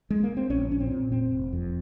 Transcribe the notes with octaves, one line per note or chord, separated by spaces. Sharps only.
G#3
A#3
C4
A#1 C#4
A#2 C#4
C4
A#2
F1 C4
F1
F2